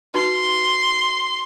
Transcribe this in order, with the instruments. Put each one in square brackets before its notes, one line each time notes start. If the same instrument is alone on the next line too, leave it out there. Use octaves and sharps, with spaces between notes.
[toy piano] D#4 F#4 B4 [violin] C6